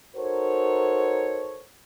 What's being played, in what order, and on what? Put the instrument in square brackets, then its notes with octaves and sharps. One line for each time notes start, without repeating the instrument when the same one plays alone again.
[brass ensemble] D#4 F#4 A4 A#4 C5 C#5